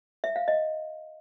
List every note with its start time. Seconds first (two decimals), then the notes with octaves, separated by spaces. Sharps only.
0.24 E5
0.36 F5
0.48 D#5